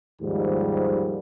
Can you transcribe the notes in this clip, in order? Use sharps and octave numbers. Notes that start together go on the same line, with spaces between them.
D#2 G#2 D#3 F3 G3